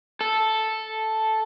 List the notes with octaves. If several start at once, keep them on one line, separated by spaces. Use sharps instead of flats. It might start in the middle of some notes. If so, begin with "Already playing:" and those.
A4